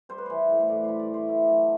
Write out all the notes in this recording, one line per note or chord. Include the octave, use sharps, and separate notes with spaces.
G3 C5
B4
E3 C5
A2
C5
A2 D5
G3 C5
D5
E3
C5
A3 E4
F#3 D4